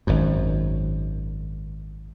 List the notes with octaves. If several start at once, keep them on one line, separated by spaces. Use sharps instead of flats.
G#1 F#2